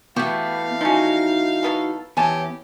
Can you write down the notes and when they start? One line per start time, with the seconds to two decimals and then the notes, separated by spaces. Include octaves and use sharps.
0.16 E3 A3 B3 F#4 G4 F5 F#5
0.81 F3 C#4 D#4 F#4
1.63 F#3 B3 A4
2.17 E2 E3 C#4 G4 G#5 A5